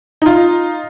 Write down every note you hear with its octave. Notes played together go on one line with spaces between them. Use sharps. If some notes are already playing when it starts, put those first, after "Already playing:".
D#4 F4